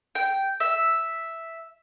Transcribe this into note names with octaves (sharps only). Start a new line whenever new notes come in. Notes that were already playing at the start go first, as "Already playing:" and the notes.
G5
E5